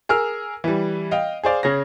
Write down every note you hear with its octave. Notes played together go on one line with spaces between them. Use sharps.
G#4 A#4 E6 F6
E3 G3
D#5 F5 G5
G#4 C5 D5 F5
C#3 C#5 A#6